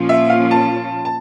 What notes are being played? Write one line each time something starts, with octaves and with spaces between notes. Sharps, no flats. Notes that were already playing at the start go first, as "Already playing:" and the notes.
Already playing: A#2 F3 C#4 F4
E5
F5
A5
A5